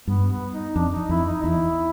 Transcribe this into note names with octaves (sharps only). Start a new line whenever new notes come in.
G2 B3
B3
D#4
F2 D4
D#4
F2 E4
D#4
E2 E4